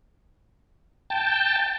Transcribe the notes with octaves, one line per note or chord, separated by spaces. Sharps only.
G5 A5